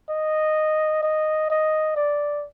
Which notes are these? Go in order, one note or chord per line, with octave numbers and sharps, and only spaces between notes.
D#5
D#5
D#5
D5